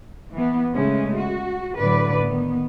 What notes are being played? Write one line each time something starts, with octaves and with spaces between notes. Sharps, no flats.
E3 B3
C#3 G#3 A3 C#4
F#4
A2 D3 F#3 B4 D5
D#3 B3